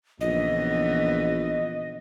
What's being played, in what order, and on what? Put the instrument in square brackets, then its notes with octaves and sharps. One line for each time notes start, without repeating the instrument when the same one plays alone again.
[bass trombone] A#1 [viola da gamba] C#3 E3 B3 [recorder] D#5